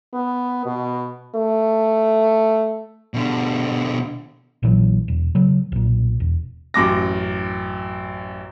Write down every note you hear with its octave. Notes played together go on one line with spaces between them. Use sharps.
B3
B2
A3
B2 D3
A#1 A#2 E3 F#3
E1
C#3 F#3
B1 A#2
E1
A1 F#2 D6 A#6